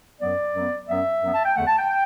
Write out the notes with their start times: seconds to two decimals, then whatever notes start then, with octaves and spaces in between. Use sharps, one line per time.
0.21 F#2 F#3 B3 D5
0.55 F#2 F#3 B3
0.89 F#2 F#3 B3 E5
1.22 F#2 F#3 B3
1.34 A5
1.45 G5
1.56 E2 D3 A3 F#5
1.67 A5
1.78 G5
1.90 G5